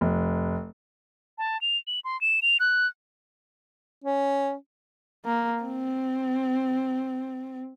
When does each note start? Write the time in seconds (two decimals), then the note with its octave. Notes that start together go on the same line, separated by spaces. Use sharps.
0.01 F1
1.38 A5
1.61 F7
1.87 F#7
2.05 C6
2.21 E7
2.42 F7
2.60 F#6
4.04 C#4
5.25 A#3
5.63 C4